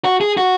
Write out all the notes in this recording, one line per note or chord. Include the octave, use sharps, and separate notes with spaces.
F#4
G#4
F#4